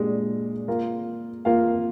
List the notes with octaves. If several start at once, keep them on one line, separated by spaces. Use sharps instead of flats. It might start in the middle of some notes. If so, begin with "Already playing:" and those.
Already playing: A#2 G#3 D4 G4
A#3 F4 A#4 F5
A#3 F4 A#4 F5